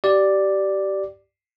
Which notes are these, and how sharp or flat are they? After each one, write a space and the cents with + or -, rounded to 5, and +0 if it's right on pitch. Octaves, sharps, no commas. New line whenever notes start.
G4 -25 D5 +0